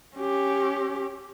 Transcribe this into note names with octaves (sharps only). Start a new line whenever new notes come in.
C#4 G4